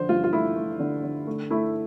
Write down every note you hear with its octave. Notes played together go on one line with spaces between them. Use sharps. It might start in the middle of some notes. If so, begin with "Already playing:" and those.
Already playing: D3 F3 C5
G2 F4
F4
A3 E4
A3
D3
D3
A3
A3 E4